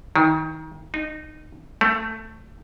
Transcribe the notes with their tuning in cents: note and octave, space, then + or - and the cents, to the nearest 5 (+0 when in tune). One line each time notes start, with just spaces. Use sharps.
D#3 +25
D#4 -20
A3 +10